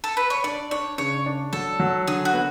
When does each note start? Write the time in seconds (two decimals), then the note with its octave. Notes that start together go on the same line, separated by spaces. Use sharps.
0.04 A4
0.17 B4
0.30 C#5
0.44 D4 D5
0.71 D4 C#5
0.98 C#3 C#5
1.26 D4
1.53 F#3 A4
1.80 F#3
2.08 D3 G#4
2.25 F#4
2.34 B3